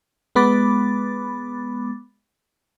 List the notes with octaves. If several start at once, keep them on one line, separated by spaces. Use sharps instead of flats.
G#3 B3 B5 D6 A6